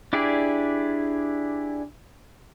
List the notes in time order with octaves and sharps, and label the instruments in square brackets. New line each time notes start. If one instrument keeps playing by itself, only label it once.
[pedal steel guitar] D4 E4 G4 G#4 D5